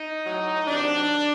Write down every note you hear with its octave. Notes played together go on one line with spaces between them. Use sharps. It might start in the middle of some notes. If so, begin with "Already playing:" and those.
Already playing: D#4
A2 F#3
C3 D#3 F#3 D4